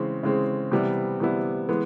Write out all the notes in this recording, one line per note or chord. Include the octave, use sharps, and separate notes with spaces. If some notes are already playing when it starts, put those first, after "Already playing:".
Already playing: C#3 E3 G#3 C4
C#3 E3 G#3 C4
C3 E3 G3 B3 E4
C3 E3 G3 B3 E4
E3 G#3 B3